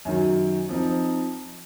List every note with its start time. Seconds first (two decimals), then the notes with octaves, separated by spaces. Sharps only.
0.05 F#2 D#3 F#3
0.69 F3 C4 D#4